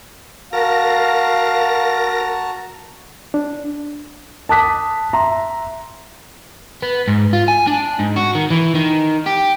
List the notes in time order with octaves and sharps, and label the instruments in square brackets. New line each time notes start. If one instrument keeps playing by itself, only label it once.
[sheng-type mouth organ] F#4 A5 A#5 [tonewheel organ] A#4 A#6 [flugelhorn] F5
[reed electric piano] D4
[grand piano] A5 D6 D#6 F#6 B6
E5 A#5 C6
[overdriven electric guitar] B3
G#2
F4
G#5
D4
G#2
F#4
D#3
E3
D#3
G4